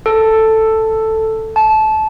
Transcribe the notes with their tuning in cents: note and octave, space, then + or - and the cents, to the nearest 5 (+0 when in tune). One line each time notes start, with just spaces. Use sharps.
A4 +5
A5 -20